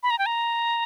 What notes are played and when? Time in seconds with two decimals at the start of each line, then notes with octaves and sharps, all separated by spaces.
0.03 B5
0.10 A#5
0.19 G5
0.26 A#5